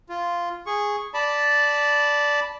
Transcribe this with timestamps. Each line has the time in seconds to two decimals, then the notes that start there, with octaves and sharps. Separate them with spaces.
0.09 F4
0.67 G#4 C#6
1.14 D5 A5 B5